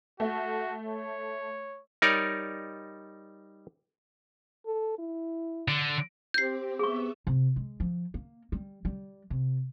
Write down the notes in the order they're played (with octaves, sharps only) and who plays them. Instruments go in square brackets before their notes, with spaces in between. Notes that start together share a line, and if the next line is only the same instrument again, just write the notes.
[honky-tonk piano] A3 [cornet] F#4
[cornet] C#5
[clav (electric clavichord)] G3 D#4 A#4 C#5 D5
[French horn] A4
E4
[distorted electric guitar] D3
[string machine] C4 G4 C5 [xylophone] G6 C7
[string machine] B3 E5 E6 [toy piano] G#4 C#6
[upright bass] C3
G#3
F3
A#3
G3
G3
C3